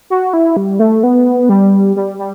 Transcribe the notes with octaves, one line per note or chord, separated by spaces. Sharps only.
F#4
E4
G3
A3
B3
G3
G3
G3